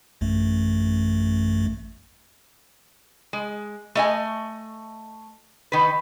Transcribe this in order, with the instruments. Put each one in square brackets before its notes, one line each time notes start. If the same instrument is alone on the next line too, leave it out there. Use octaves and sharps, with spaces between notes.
[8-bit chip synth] A1 F#2 A3
[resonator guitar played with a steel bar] G#3
A3 D#5 G#5
D#3 B4